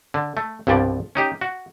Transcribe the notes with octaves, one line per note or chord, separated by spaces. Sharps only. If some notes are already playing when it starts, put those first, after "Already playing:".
D3
A3
C2 G2 B2 F3 D5
C#4 D#4 G4
F#4